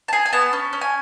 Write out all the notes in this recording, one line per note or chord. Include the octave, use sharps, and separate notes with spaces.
A5
G#4 G#5
G#5
B3 A5
C#4
C#4
G#5